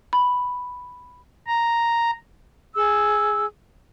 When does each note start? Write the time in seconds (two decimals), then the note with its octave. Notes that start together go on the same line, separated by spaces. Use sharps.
0.13 B5
1.47 A#5
2.75 G#4 E6